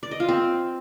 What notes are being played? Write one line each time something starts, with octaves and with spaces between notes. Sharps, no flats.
D5
D#5
F4
C4